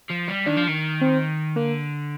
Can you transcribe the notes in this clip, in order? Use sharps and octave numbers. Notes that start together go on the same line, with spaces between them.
F3
G3
D#3 D4
F3
D#3
C4
D3 A#3